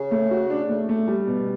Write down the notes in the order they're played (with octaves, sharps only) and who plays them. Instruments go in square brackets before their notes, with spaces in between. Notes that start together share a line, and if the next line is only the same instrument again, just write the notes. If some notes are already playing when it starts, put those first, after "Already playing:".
Already playing: [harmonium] C#3
[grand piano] A3
F#4
D4
A3
A3
G3
B2